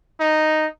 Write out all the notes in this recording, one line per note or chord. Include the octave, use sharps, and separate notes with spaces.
D#4